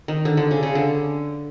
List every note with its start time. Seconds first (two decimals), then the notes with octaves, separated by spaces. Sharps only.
0.08 D#3
0.25 D3
0.37 D3
0.51 C#3
0.63 C#3
0.75 D3